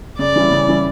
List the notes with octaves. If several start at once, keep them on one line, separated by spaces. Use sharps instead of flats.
C#3 D5
E3 G3 C#4 E4
C#3
E3 G3 C#4 E4